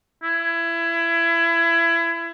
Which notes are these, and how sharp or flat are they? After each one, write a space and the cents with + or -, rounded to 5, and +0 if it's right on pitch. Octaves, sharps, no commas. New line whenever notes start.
E4 +25